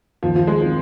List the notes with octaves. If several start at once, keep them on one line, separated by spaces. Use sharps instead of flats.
D#2 F3
F3
G#3
D#3 C4 F4